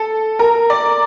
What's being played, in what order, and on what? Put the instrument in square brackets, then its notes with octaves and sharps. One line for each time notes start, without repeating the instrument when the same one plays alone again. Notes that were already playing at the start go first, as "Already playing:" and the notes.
Already playing: [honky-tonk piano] A4
A#4
D5